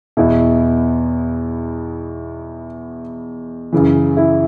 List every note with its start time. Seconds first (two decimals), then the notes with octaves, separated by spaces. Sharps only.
0.17 E2 B2 E4
3.72 F#2 C#3 E3
4.17 E4